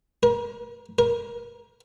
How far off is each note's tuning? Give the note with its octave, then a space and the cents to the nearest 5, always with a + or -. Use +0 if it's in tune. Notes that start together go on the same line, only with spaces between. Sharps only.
A#4 +35
A#4 +20